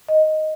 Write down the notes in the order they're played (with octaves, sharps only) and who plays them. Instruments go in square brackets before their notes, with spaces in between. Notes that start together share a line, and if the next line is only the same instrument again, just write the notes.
[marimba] D#5